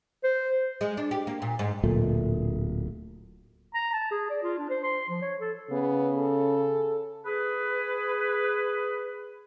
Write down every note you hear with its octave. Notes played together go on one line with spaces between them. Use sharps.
C5
G#3
D4
G4
A#3
A#2
G#2
D1 A#2 A3
A#5
A5
G#4
D5
F4
D4
C5
C6
F3
C#5
A4
C#3 B3
A4
G#4 B4